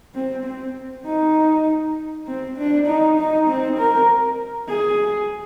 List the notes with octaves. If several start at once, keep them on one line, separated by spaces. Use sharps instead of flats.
C4
C4
D#4
C4
D4
D#4
D#4
C4
A#4
G#4